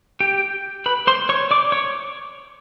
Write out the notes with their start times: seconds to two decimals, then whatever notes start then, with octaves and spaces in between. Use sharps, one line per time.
0.20 G4 G5
0.86 B4 B5
1.07 C5 C6
1.29 C#5 C#6
1.51 D5 D6
1.72 C#5 C#6